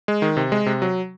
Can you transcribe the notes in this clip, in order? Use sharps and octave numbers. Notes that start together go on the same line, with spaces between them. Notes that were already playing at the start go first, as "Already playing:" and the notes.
G#3
D#3
C3
G#3
C3
F#3